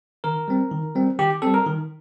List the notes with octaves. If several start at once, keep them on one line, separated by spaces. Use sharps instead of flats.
D#3 A#4
G3 C4
D#3
G3 C4
D#3 G4
G3 C4 A4
A#4
D#3